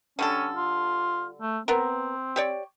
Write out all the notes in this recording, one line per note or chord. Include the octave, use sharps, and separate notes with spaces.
D3 G3 C#4 A4
F4
A3
B3 C4 A#4
G4 C#5 D5